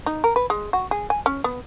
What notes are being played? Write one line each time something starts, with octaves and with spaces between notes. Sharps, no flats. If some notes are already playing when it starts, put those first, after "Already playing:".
D#4
A#4
B4
G#3
F#4
G#4
G#5
C#4
B3